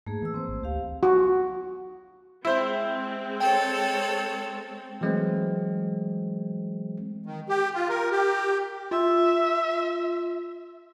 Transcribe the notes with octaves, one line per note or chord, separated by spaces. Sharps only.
G#2 A3 A#3 G#4
E3 A3 E6
E3 C4 C5
A1
D2 G4 F5
F#4
G#3 C4 E4 C5
A4 C#5 G5
E3 F#3 G#3 A3 C4
D#3
G4
F4
A#4
G4
F4 E5